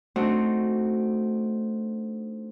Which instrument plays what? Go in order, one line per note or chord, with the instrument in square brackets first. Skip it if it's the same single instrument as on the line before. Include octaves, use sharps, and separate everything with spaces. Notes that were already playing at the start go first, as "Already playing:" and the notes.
[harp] A3 C4 D4 D#4 F#4